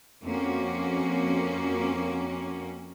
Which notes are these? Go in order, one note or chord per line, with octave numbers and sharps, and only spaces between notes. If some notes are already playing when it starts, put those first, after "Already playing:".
F2 A#3 C#4 F#4